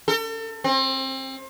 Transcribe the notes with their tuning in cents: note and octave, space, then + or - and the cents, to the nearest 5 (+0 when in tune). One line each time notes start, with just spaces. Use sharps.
A4 +40
C4 +30